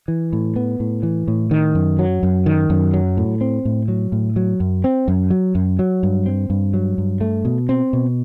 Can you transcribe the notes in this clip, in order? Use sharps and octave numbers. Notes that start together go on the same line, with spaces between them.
E3
A2
B3
A2
E3
A2
D#3
F#2
F#3
F#2
D#3
F#2
F#3
A2
C4
A2
F#3
A2
F#3
F#2
C4
F#2
F#3
F#2
F#3
G2
C4
G2
F#3
G2
A3
B2
C4
B2